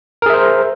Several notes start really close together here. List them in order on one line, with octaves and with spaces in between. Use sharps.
A#4 G#4 E5 C5